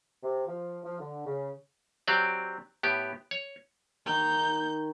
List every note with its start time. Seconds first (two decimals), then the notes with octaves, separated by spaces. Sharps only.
0.23 C3
0.47 F3
0.85 F3
1.00 D3
1.26 C#3
2.07 F#3 C4 G4 D5
2.83 A2 B3 G4
3.31 C#5
4.06 D#3 D#4 G6